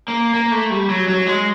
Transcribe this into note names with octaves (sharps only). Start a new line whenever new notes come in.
A#3
A#3
A3
G3
F#3
F#3
G#3